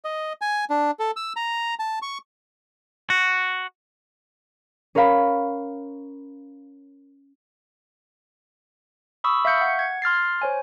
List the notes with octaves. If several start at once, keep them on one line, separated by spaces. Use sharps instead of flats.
D#5
G#5
D4
A4
E6
A#5
A5
C#6
F#4
C#4 A#4 C#5 F5 B5
B5 C#6 D#6 E6
E5 F5 C#6 G6 C#7
F#5
G#6
C6 F6 A6 C7
C5 C#5 G#5